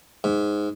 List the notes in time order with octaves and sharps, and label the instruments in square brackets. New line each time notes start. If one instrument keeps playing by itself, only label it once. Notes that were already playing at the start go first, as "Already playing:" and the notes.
[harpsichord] G#2